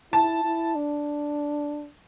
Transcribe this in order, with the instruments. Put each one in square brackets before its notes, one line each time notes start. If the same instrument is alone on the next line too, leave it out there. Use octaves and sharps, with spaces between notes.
[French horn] E4 [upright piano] A5
[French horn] E4
D4